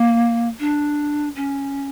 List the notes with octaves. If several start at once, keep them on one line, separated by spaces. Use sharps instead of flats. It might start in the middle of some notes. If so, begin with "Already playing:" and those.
Already playing: A#3
D4
C#4